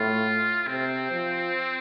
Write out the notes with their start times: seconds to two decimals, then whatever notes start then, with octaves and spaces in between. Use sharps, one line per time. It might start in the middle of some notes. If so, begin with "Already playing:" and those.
Already playing: A2 F4
0.67 C3 C4
1.12 F3